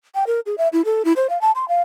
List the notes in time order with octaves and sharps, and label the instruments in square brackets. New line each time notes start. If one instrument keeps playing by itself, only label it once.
[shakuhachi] G5
A#4
G#4
E5
E4
A4
E4
C5
F5
A5
C6
F5